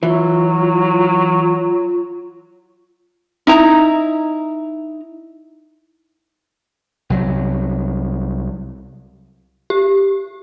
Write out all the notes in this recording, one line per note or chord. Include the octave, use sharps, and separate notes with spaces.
E3 F#3 F4
D#4 E4 A#5
C2 F#3
G4